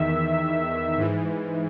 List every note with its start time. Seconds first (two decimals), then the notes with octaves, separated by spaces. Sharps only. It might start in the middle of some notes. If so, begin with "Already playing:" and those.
Already playing: E2 D#3 E5
0.97 G#2 E3